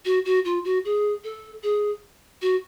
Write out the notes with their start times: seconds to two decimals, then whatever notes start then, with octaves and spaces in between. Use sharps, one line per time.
0.05 F#4
0.25 F#4
0.45 F4
0.65 F#4
0.85 G#4
1.24 A4
1.63 G#4
2.42 F#4